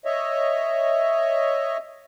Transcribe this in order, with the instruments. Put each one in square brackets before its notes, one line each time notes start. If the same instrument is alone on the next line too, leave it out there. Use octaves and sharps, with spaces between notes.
[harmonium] C#5 D#5 E5